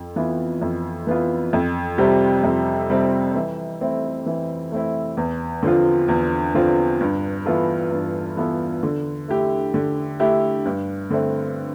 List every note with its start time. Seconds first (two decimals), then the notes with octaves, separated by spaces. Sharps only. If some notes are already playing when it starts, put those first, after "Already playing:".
Already playing: F2
0.16 E3 B3 F4
0.61 F2
1.07 E3 B3 F4
1.53 F2
1.98 C3 G3 C4 G4
2.43 F2
2.90 C3 G3 C4 G4
3.35 E3
3.81 A3 C4 E4
4.26 E3
4.72 A3 C4 E4
5.17 E2
5.63 D3 F3 C4 F4
6.08 E2
6.54 D3 F3 C4 F4
7.01 G2
7.46 E3 B3 F4 A4
7.91 G2
8.37 E3 B3 F4 A4
8.83 D3
9.28 A3 E4 G4
9.74 D3
10.20 A3 E4 G4
10.65 G2
11.10 D3 A3 C4